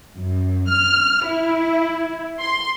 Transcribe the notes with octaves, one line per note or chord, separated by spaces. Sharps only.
F#2
F6
E4
C6